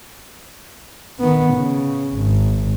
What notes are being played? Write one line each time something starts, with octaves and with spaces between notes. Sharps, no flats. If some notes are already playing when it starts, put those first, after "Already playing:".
D#3 B3
C#3
G#1